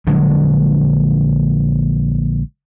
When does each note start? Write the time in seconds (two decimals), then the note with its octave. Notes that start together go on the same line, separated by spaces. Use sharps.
0.07 A#1 D3 F#3 G#3